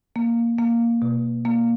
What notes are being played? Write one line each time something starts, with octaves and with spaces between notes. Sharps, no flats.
A#3
A#3
B2
A#3